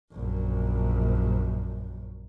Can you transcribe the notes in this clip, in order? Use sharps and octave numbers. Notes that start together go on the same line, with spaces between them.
A#1 F#2